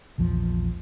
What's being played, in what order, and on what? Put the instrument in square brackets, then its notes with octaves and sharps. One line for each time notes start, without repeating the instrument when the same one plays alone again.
[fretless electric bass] A#1 E2 F3